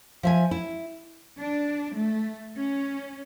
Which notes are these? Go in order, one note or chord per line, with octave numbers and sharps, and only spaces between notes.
F3 E5 G#5
E4
D4
A3
C#4